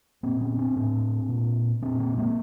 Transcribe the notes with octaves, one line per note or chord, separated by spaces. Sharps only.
A#2 A#3 C4
B3 C#4
C4 D4
A2
A#2
A#2 C4 D4
A#3 C4
G#3 A#3